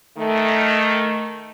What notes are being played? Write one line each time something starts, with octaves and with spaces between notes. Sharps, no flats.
D#3 A3